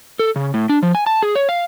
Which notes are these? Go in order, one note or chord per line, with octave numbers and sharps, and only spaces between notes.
A4
C#3
A2
D4
F3
G#5
A5
G#4
C#5
F5